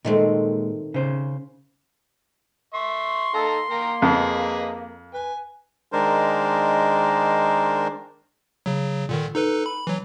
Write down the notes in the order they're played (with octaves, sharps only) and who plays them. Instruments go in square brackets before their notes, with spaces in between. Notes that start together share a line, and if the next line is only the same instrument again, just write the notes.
[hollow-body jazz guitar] A#2 G#3 [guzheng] D#3 A3 C4
[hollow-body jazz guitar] C#3 C5
[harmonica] E5 C#6 [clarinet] C6
[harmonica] D#4 F5 A#5 [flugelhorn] A4
[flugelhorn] A#3 [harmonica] A#4 G5 A#5
[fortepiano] F2 [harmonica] G#4 B4 D#5
[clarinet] B4 [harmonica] G#5
[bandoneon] D#3 G#3 D4 A#4 C5
[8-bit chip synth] C#3 F#3
A#2 D3 D#3
D#4 A4 B4
B5
E3 F#3